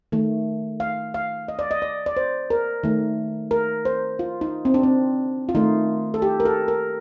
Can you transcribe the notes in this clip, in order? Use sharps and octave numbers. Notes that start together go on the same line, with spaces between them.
D#3 A3
F5
F5
D#5
D5
D#5
D5
D5
C5
A#4
D#3 A3
A#4
C5
F4
D#4
C4
D4
C4
F4
D#3 A3 D#4
A4
G4
A#4
A4
A#4